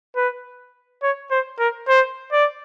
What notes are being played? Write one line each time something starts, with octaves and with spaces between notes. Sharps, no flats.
B4
C#5
C5
A#4
C5
D5